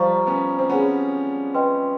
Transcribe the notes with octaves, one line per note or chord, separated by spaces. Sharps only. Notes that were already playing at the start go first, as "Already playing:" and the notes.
Already playing: F3 G3 C5 F5 A#5 C#6
B3 C#4
C4
B3 C#4 G#4 C#5 F#5
B4 D#5 G5 C6